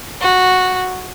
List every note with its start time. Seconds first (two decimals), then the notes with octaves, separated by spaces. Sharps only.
0.21 F#4